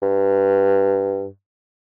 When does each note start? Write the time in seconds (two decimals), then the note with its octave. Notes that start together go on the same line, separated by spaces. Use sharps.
0.03 G2